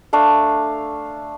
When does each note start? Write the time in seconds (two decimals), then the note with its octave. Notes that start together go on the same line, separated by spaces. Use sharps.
0.13 A3 D4 F5